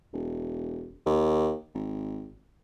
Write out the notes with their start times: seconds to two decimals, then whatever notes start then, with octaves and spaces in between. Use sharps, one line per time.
0.13 E1
1.06 D#2
1.74 G#1